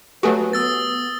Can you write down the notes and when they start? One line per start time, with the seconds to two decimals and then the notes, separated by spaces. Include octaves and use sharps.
0.23 F#3 A3 F#4 G4 A4 B4 G#5
0.53 B3 D#6 E6 A6